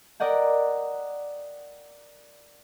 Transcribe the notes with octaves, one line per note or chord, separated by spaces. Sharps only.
A#4 D5 D#5 F#5 G5